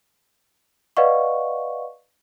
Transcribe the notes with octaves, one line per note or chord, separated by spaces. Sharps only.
B4 D5 D#5 F5 F#5 C#6